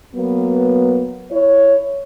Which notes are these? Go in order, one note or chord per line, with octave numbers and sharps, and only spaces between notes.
F#3 A#3 B3
E4 C#5